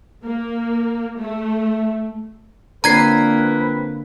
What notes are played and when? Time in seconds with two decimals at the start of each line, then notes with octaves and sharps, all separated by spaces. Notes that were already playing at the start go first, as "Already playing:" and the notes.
0.24 A#3
1.19 A3
2.84 D3 F3 A#3 C4 B4 A#5 G#6 C7